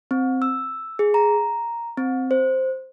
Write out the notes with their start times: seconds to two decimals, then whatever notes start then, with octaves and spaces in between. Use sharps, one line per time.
0.11 C4
0.42 E6
0.99 G#4
1.14 A#5
1.97 C4
2.31 C5